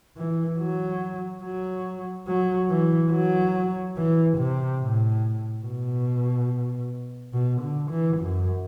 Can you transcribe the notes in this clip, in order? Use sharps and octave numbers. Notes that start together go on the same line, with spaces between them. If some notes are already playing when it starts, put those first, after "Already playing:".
E3
F#3
F#3
F#3
E3
F#3
E3
C3
A2
B2
B2
D3
E3
F#2